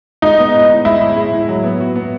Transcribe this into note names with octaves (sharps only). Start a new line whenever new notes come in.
G#3 D#4
B3
A2
A2
G#3 E4
A2
G#3
A2
F#3
B3
F#4
B3